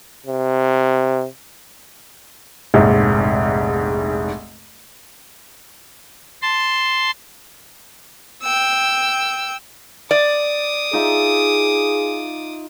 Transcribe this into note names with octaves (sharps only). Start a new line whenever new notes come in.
C3
F1 A#1 G#2
A5 C6
G5 E6
D5 D6 D#6
D#4 F4 G#4 E5